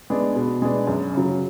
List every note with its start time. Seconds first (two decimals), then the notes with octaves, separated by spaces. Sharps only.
0.10 G#3 B3 D4
0.36 B2
0.62 G#3 B3 D4
0.87 F#2
1.14 C#3 F#3